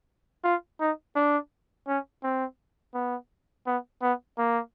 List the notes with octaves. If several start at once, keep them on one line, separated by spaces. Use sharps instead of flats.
F4
D#4
D4
C#4
C4
B3
B3
B3
A#3